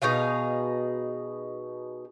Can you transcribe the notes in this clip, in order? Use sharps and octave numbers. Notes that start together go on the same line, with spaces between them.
B2 D#4 G#4 F5